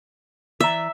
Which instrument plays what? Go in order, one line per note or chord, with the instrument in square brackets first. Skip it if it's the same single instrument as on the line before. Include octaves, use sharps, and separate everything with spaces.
[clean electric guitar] E3 D5 A#5 [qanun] E5